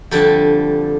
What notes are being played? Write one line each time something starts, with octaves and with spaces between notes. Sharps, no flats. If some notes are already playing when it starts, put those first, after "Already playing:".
F2 D3 G3 G4 A4